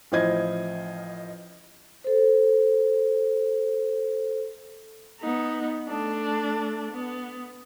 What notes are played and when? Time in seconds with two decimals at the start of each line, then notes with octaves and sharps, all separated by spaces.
0.12 A1 F3 E4 C5 D#5 G#6
2.04 A4 C5
5.20 B3 D#4
5.88 A3 D4
6.92 B3